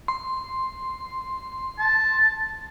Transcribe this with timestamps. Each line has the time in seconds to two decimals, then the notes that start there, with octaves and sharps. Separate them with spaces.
0.08 C6
1.79 A5